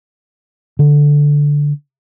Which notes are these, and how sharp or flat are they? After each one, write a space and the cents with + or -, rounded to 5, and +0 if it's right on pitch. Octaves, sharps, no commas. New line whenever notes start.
D3 -5